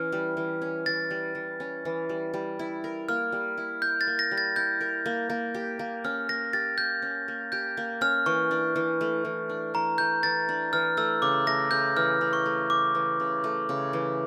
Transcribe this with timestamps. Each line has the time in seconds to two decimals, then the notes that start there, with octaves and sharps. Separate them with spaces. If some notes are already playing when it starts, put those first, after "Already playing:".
Already playing: E3 C#4 F6
0.12 G3
0.37 E3
0.62 C#4
0.86 E3 A6
1.10 G3
1.35 E3
1.60 C#4
1.85 E3
2.09 G3
2.34 G3
2.59 E4
2.84 A#4
3.09 A#3 F6
3.32 G3
3.57 E4
3.82 A#4 G6
4.01 A6
4.07 A#3
4.19 A#6
4.31 G3
4.38 A6
4.56 E4 G6
4.81 A#4
5.06 A#3
5.30 A#3
5.54 G4
5.79 A#3
6.04 C#4 F6
6.29 A#3 A#6
6.53 G4 A6
6.78 A#3 G6
7.02 C#4
7.28 A#3
7.52 G4 G6
7.77 A#3
8.01 C#4 F6
8.26 E3 C#6
8.51 D4
8.76 E3
9.01 A3
9.25 E3
9.49 D4
9.74 E3 A#5
9.98 A3 G6
10.23 E3 A6
10.49 D4
10.73 E3 F6
10.97 A3 E6
11.22 C#3 D6
11.47 A3 A#6
11.71 C#3 G6
11.96 E3 F6
12.21 C#3
12.33 C#6
12.46 A3
12.70 C#3 D6
12.95 E3
13.20 C#3
13.44 A3
13.69 C#3
13.93 E3